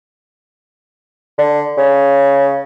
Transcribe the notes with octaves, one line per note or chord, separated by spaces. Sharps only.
D3
C#3